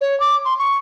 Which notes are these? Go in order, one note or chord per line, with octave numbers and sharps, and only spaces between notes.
C#5
D6
C6
C#6